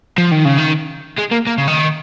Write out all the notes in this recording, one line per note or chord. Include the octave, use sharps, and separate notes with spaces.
F3
D#3
C#3
D#3
G#3
A#3
A#3
C#3
D#3